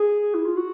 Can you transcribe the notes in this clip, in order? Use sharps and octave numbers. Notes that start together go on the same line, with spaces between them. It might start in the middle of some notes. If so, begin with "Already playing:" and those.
Already playing: G#4
E4
F4
F#4